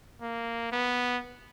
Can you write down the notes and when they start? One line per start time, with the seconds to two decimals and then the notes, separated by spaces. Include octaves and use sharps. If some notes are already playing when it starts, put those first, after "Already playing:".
0.22 A#3
0.72 B3